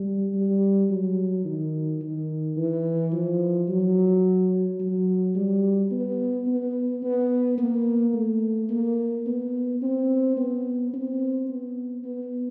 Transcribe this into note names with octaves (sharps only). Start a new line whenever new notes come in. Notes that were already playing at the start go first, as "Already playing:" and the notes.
Already playing: G3
G3
F#3
D#3
D#3
E3
F3
F#3
F#3
G3
B3
B3
B3
A#3
A3
A#3
B3
C4
B3
C4
B3
B3